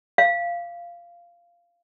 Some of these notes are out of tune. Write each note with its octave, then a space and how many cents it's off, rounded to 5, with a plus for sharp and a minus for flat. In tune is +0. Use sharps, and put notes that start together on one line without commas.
F5 -10